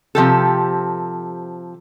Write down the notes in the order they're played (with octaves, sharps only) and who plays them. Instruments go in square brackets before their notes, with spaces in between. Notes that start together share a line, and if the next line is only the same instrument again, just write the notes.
[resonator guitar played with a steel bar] C3 F3 G4 A4